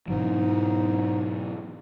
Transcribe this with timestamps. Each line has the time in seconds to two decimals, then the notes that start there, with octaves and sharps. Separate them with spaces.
0.08 G#2 B2 E3 F#3